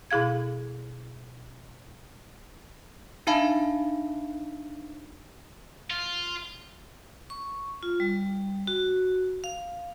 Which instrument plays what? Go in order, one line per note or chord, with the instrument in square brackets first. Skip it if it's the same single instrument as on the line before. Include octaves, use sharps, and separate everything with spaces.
[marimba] B2 E4 G#4 F5 G#6
[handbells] D4 D#4 E5 F5 A5 B5
[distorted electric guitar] F4
[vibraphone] C#6
F4
G3
F#4
F5